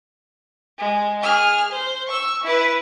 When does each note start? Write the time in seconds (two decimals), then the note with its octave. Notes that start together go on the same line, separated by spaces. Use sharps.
0.78 G#3
1.21 G#4 F6
1.71 C5
2.07 C#6 E6
2.43 E4 B4